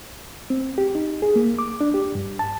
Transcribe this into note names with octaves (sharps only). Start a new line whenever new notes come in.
C4
G4
D#4
G#4
A#3
D6
D4
G4
G2
A5